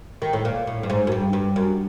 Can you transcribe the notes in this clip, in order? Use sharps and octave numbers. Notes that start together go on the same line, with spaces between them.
D#3
A2
A#2
A2
G2
G#2
F#2
G2
G2
F#2